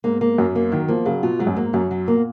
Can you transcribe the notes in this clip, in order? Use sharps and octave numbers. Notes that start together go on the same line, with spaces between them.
G#2 A#3
A#3
F#2 F#3
A#3
D#3 F#3
F3 A#3
C#3 F#3
B2 F4
G#2 F#3
F#2
G#2 A#3
F#2 F#3
F#3
A#2 A#3